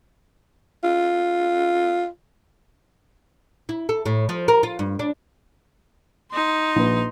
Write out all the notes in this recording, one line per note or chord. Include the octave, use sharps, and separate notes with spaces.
F4
E4
A4
A2
F3
A#4
F4
G2
D4
D#4 C6
A#1 B4